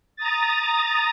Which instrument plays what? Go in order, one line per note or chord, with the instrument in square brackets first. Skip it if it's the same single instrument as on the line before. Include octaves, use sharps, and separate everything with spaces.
[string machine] A#5 D#6 A6